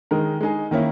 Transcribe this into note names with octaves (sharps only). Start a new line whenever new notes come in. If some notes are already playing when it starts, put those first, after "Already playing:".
D#3 G#3 D#4 A#4
G#3 D#4 G#4
D#3 A#3 C#4 E4